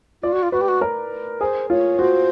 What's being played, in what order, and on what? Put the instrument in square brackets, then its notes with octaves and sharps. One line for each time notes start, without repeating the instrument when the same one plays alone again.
[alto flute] F4 [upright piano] D5
[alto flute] F#4
F4
[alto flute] F#4 [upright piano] B4
[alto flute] G4
F#4
[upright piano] A#4
[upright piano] G#4 [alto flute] C5
[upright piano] F4 [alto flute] C#5
[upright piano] F#4 [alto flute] C5